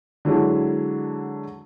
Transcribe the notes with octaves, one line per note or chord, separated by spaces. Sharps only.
D3 F#3 G#3 D4 E4